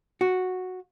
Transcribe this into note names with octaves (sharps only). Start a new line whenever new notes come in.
F#4